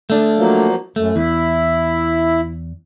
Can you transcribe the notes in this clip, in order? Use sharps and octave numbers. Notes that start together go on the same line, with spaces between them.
A3 D4
F3 F#3 A#3
F#2 A3
E2 E4